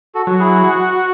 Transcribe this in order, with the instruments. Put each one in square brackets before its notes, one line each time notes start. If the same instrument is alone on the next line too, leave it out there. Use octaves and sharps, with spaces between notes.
[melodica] F#4 A4
[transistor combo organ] F#3
[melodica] E4 G#4
[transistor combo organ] F#4